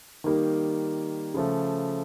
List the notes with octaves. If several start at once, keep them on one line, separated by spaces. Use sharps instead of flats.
D#3 G3 A#3 D#4
C#3 F3 A3